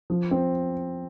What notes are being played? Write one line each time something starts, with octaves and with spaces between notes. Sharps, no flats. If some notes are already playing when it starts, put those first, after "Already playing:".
F3
C4